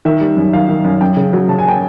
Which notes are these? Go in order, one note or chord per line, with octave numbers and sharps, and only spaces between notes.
D#3 E5
G3
F#2
D#3 F5
D#3
F#2
F#2 G5
C#3
F#3
C#3 A5
G#5
G5